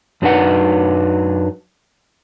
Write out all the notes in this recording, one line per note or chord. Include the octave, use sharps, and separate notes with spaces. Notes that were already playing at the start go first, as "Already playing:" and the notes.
F#2 F#3 D4 D#4 B4 F#5